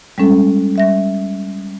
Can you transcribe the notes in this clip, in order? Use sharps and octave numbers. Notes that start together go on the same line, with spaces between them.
G3 G#3 C#4 A4
G3 E5 A#6